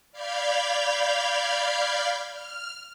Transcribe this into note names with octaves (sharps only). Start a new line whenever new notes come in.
D5 F5 B5 F6 G6 G#6
F6